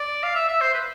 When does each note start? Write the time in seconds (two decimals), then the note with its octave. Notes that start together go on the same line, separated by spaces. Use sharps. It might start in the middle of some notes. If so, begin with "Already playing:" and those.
Already playing: D5
0.23 F5
0.35 E5
0.48 E5
0.61 C5
0.74 B4